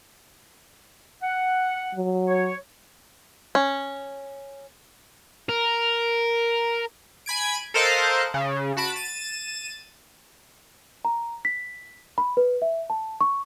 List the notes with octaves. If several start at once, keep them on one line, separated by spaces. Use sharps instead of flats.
F#5
F#3
C#5
C#4
A#4
G#5 B5 G#6 D7
A4 A#4 C5 D#5 F5 F#6
C#3
F#4 A5 B5 D7
A6 D#7 E7
A#5
B6
B5
B4
E5
A5
C#6